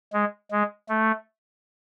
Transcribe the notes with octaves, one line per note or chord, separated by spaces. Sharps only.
G#3
G#3
A3